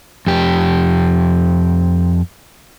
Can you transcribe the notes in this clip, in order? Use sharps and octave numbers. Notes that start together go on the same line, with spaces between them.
F2 G4